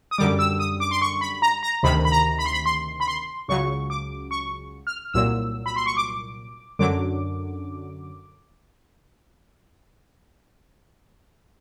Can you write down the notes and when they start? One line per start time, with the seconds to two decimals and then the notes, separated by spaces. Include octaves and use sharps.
0.11 D#6
0.18 F#2 D3 G3 D6
0.39 E6
0.59 D#6
0.80 D6
0.91 C6
1.02 C#6
1.21 B5
1.42 A#5
1.63 A#5
1.83 D2 C3 D#3 B5
2.05 B5
2.12 A#5
2.39 B5
2.46 C6
2.53 B5
2.66 C6
3.00 B5
3.08 C6
3.48 C#2 C#3 F#3 C#6
3.90 D6
4.31 C#6
4.87 F6
5.14 C2 A#2 F#3 E6
5.66 B5
5.76 C6
5.86 C#6
5.97 D6
6.79 F#2 D3 F#3 D6